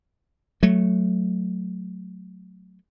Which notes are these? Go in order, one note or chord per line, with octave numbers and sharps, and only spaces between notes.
F#3 A3